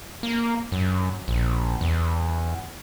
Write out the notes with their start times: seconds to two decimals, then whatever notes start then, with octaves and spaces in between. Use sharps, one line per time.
0.23 A#3
0.72 F#2
1.28 A#1
1.81 E2